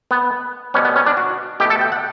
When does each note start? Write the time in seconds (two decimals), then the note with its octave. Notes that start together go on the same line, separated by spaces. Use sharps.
0.11 B3
0.74 B2 G3 B3 C#4
0.85 B3
0.96 C#4
1.06 D4
1.17 F#4
1.60 B2 A3 G4
1.70 A4
1.81 G5
1.92 F#5